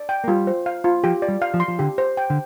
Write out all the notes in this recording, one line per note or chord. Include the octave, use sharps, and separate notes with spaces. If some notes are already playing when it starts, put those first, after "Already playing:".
Already playing: D5
G5
A#3
G3 F4
C5
F5
F4
F3 G4
D5
G3
F5
F3
C6
F3
D3 G4
C5
G5
D3